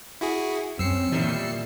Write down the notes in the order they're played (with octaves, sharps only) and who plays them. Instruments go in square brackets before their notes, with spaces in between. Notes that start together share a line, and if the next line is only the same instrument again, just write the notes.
[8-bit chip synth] E4 F#4 G#4
[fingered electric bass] F#2 [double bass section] C4 C#4 [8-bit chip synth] E6 C7 C#7
[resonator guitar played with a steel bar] E2 D#3 G3 [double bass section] A#2 [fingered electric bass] E3